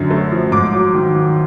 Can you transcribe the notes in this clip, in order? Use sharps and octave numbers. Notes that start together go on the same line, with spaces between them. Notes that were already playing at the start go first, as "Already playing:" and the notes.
Already playing: F#2 D3
A3
F3
G#2 D6
F#3
D#3
D#3